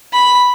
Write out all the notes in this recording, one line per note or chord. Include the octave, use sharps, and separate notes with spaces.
B5